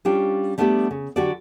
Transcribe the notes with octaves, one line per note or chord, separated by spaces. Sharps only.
G3 C#4 D4 F4 G4
G3 A3 B3 D4 F#4 G4
C#3
D3 F#3 F#4 G4 A4 D5